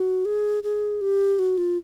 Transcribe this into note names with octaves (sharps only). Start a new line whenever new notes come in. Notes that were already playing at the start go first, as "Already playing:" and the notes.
Already playing: F#4
G#4
G#4
G4
F#4
F4